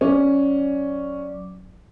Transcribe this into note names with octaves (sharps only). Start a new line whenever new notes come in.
F#3 C#4 D5 D6